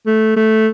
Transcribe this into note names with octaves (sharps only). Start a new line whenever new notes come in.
A3
A3